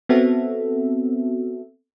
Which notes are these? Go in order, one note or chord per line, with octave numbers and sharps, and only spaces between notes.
B3 C4 F#4 A4 E5